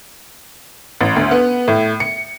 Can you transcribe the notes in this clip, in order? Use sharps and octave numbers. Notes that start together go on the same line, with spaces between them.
A1
D2
B3
A2
C#7